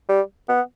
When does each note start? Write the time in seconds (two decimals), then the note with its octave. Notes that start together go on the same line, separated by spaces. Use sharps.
0.09 G3
0.49 B3